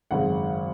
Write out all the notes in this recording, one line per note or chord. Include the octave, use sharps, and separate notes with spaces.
G#1 F#2 C#3 F#5